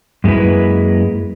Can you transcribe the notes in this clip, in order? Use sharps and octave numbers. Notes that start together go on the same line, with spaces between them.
F#2 G#3 A#3 E4 B4